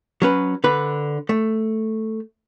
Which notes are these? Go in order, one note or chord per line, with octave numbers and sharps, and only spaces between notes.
F#3 C#4 B4
D3 B4
A3